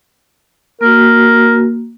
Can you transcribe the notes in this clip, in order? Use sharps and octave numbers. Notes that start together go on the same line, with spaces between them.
A#3 F#4 A#4